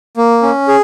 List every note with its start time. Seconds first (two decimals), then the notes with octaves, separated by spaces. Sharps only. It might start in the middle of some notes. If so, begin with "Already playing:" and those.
0.17 A#3
0.42 C#4
0.68 G#4